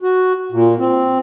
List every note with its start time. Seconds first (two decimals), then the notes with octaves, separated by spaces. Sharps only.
0.02 F#4
0.52 A#2
0.79 C4